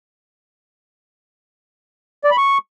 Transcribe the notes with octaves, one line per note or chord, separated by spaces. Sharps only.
D5
B5
C#6